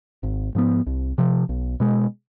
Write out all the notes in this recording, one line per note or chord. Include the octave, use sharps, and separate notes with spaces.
G#1
G#2 F3 B3
C2
C3 F3
B1
B2 G#3